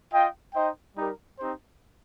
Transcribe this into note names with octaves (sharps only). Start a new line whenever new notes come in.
F4 D#5 G5
D#4 C5 D#5 G5
G3 D#4 G4 A#4
C4 D#4 G4 C5